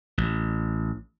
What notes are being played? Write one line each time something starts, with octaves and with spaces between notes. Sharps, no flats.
A1